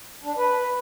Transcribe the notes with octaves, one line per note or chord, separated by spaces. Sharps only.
D4
B4